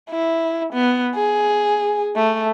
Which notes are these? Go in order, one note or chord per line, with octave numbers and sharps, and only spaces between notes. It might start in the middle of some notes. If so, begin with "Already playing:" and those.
E4
B3
G#4
A3